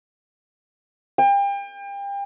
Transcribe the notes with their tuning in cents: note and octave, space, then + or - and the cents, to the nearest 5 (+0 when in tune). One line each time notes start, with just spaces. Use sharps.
G5 +35